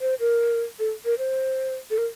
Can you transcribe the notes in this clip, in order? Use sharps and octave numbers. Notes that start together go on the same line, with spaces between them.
C5
A#4
A4
A#4
C5
A4
A#4